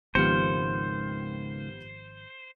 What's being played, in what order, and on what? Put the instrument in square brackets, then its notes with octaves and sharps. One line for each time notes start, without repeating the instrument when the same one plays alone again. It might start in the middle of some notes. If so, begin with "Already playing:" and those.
[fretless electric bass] G#1 F3 [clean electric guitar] C#2 D#3 [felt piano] B3 G4 C#7 [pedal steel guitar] C5